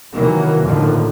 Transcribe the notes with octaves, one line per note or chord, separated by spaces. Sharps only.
C3 D#3 E3 F#3 A#3
A#1 F2 A2 D3 D#3 F3